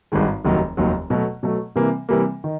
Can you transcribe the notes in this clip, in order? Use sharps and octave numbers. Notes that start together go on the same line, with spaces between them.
G#1 G2 D#3 G#3
F1 D#2 D#3 F#3
F1 D#2 D#3 F#3
B2 F#3 A3
B2 F#3 A3
C3 E3 G3 A#3
C3 E3 G3 A#3
D#3